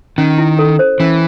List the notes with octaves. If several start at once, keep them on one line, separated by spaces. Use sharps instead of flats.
D#3 C#4
E4
A4
C5
E3 C#4